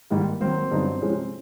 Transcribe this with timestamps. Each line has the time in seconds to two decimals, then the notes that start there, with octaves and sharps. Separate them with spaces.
0.11 G#2 D#3 G3 A#3 D#4
0.41 D#3 F#3 A#3 C4 C5
0.71 G2 D3 F#3 B3 D#4
1.01 C3 F3 G#3 C#4